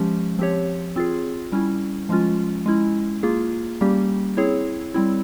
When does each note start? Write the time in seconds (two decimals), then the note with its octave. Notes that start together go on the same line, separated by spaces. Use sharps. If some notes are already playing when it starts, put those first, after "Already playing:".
Already playing: F3 G#3 C#4 G4
0.38 F3 C4 G4 C#5
0.96 C4 F4 G#4
1.52 G3 C#4 E4
2.09 F3 G#3 C#4 F4
2.66 G#3 C#4 E4
3.23 A#3 F4 G#4
3.81 G3 A#3 C#4 G4
4.37 C4 E4 G#4 C#5
4.94 G3 C4 E4